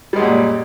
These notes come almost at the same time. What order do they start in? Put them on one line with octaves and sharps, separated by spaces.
G3 G#3 F#2 A#2